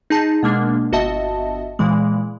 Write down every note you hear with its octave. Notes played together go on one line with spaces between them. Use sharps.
D#4 G#4 A5
B2 G#3 A#3 D4
G1 F#4 D#5 E5 A5
A#2 E3 G#3